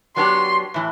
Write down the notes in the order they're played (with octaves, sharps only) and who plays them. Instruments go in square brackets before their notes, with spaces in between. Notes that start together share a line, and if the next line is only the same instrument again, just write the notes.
[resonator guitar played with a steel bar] F#3 B3 D4 G4 [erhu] C6
[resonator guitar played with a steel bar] A2 E3